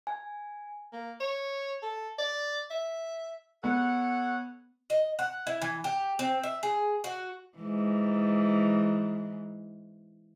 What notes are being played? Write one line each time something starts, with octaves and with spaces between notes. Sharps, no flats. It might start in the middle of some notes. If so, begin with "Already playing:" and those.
G#5
A#3
C#5
A4
D5
E5
B3 A4 C#5 F#5
D#5
F#5
E4
E3
G4
C4
E5
G#4
F#4
G#2 E3